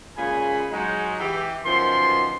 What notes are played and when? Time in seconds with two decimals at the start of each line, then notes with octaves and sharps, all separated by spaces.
0.17 A#2 C#3 G#3 G#4 G#5 B5
0.71 F#3 G#3 D#4
1.20 E3 G4
1.64 F#2 B2 D#3 F3 C6